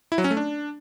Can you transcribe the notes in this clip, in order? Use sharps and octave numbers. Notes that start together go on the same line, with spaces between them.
E4
F#3
C#4
A3
D4